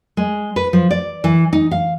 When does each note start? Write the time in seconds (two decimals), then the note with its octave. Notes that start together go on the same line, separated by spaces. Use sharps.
0.17 G#3
0.56 B4
0.73 F3
0.91 D5
1.24 E3
1.53 D#4
1.71 F5